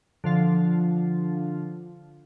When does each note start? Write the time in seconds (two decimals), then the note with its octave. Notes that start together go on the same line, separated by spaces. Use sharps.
0.24 D3 F3 F4